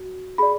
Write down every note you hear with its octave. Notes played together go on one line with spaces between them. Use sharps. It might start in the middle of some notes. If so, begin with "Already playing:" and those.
Already playing: F#4
G#4 D5 B5